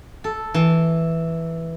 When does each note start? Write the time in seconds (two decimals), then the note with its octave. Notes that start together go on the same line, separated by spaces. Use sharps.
0.24 A4
0.54 E3